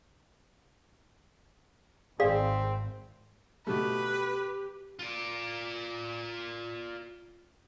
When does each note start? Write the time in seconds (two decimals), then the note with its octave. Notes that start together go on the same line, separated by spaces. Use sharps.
2.20 G#1 C4 G#4 D5 F5
3.67 B2 A3 G4 B4
4.99 F4 D5